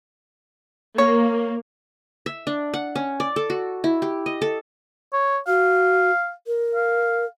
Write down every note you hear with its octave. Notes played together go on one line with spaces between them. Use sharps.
A#3 C#5
E5
D4
F#5
C#4
D5
A4
F#4
E4
G4
D#5
A4
C#5
F#4 F5
A#4
F5